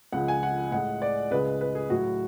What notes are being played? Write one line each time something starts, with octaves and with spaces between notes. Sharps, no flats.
C#2 C#3 F3 G#3 F#5
G#5
F#5
A2 G#3 F#5
D5
C#2 C#3 G#3 B4
B4
G#4
A2 F#3 F#4